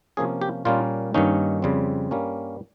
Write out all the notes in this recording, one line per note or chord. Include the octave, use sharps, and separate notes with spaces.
C3 F3 A#3 C#4 G#4
G4
A#2 G3 A#3 C#4 F4
G2 D#3 A#3 C#4 D#4
F2 C#3 G3 C4
G2 G3 A#3 C#4